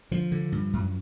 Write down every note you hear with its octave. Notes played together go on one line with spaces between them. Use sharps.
D3 F3
D3
G2
F#2